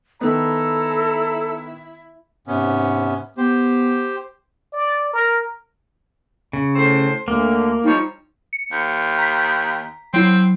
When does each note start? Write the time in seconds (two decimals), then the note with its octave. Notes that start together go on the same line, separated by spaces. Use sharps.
0.21 D#3 B3 E4 A4 A#5
2.48 G#2 C3 B3 C#4
3.38 B3 G4 C5
4.73 D5
5.13 A#4
6.53 C#3
6.76 A2 C5
7.28 D2 A#3
7.84 F3 G3 D#4 C#5
8.53 C#7
8.72 D#2
9.19 A#5 B6
10.14 F#3 C4 E4 C7